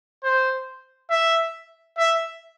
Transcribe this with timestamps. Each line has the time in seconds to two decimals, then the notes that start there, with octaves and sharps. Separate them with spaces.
0.23 C5
1.10 E5
1.98 E5